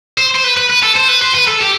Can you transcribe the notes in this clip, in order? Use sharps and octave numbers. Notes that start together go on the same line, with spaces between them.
C5
C5
B4
B4
B4
A4
C5
B4
C5
B4
A4
G4